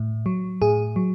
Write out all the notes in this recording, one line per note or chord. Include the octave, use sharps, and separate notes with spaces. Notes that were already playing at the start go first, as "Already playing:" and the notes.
Already playing: A2
F#3
A2 G#4
F#3